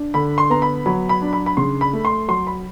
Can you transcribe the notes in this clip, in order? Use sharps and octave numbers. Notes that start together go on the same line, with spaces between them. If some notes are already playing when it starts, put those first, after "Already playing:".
Already playing: D4
D3 B5
C6
B3 A#5
B5
F#3 B5
B5
D4
B5
B5
C#3 C6
B5
A3
C6
F#3 C6
B5